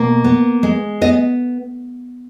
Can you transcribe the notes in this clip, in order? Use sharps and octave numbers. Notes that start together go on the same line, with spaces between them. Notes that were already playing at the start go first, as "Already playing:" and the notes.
Already playing: B2 A#3
B3
G#3
B3 D#5